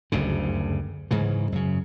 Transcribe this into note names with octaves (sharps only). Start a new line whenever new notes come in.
F#1 D2 G2 C#3
G#2 C#3 E3
F#2 C#3